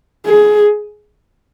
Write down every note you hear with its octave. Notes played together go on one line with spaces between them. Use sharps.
G#4